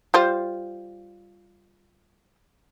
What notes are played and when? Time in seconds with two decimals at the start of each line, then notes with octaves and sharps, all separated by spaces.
0.14 G3 F4 C5